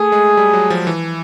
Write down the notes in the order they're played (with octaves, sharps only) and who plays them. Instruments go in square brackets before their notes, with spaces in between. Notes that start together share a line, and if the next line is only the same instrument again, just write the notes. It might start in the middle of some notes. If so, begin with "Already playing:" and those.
Already playing: [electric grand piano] A3 [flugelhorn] G#4
[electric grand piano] G#3
G3
F#3
F3
E3